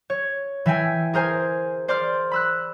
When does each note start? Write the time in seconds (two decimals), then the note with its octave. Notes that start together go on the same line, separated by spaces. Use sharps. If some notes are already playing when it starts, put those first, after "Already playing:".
0.10 C#5
0.66 E3 E5 G5 G#5
1.13 G#4 A#4 C5 G#5
1.88 C5 D5 C6 D6 F6
2.31 B5 E6 F#6